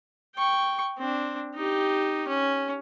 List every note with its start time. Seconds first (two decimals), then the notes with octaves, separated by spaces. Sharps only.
0.36 G5 C#6
0.98 C4 D4
1.55 D#4 G4
2.28 C#4